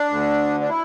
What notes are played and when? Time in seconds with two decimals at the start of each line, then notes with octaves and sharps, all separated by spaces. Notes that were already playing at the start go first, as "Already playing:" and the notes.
Already playing: D4
0.10 D2 D3
0.60 D4
0.69 E4